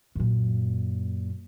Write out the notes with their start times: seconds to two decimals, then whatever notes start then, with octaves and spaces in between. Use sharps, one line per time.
0.15 F#2 A#2